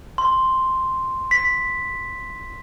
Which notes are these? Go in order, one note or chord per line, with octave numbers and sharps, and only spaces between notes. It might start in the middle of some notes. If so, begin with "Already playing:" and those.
C6
B6